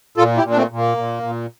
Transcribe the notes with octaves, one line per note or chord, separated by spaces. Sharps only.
A#2 F4 A4
E4 G4
A#2
D4
A3 C4
A#2
A#3
A#2
A#2